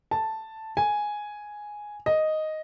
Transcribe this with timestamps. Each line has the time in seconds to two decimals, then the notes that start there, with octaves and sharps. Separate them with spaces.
0.11 A5
0.77 G#5
2.06 D#5